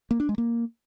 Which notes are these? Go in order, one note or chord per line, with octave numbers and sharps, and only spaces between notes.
A#3
D4
G#3
A#3